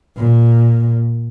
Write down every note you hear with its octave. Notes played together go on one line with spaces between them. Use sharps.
A#2